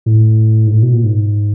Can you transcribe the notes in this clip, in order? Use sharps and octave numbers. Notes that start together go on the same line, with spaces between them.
A2
G#2
A2
B2
A#2
G#2